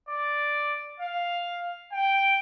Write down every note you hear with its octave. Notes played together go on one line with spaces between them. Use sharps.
D5
F5
G5